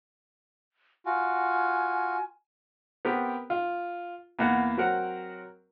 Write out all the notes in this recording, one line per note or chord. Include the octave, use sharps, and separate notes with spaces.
F4 F#4 G#5
B3 C4 G4 A#4
F4
E2 A#3 F#5
F#3 C4 F#4 A#4 F#5